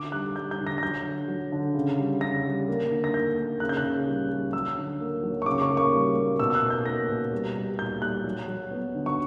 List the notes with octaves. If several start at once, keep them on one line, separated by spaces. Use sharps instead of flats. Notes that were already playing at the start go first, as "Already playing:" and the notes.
Already playing: D3 D6
G3 F#6
G3 G6
G6
D3
A#6
A#6
F#3 G6
D3
F#3
D3
C#3
G3
C#3 A#6
G3
A#3
D3
A#6
A#3 G6
A#3
C#3 F#6
G6
F#6
C#3
G3
G3
F#3 E6
D3
A#3
F#3
C#6
C#3 D6
C#6
A#3
C#6
G3
A#3
B2 E6
E6
F#6
A#3
G6
A#3 A#6
B2
G3
G3
A#2 G6
G3 F#6
F#3
F#3
B3
D3
C#6